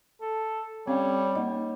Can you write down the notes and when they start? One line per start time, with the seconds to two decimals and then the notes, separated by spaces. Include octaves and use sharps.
0.21 A4
0.87 G3 C4 C#4 C#5 F5
1.35 A#3 D#4 D#5